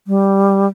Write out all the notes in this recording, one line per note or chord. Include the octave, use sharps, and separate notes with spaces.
G3